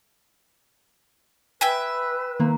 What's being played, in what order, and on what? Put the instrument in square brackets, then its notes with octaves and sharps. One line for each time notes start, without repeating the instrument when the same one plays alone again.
[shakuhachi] B4 [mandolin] E5 G5 G#5
[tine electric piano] D#3 [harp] A#3